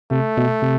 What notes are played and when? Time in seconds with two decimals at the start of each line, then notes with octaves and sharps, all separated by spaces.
0.11 C3 A3
0.37 B2
0.62 C3